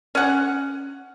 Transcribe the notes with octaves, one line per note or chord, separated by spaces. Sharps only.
C#4 F#5